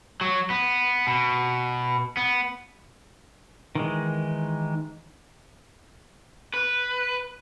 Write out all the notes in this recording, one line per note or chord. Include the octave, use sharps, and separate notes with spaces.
F#3
B3
B2
B3
D#3 E3 G#3
B4